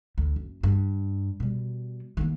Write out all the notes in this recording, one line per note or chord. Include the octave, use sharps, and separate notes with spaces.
D2
F#1
G2
B2 G3
D#3 A#3